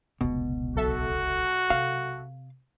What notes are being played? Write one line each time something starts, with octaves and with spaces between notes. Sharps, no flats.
F1 C#2 B2
B1 F#4 A4 E5
C3 F5